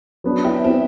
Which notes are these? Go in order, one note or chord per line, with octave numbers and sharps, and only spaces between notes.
F#3 B3 D4
E4 G4
C4 E4